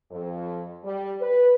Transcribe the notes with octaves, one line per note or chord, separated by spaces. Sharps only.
F2
G3
B4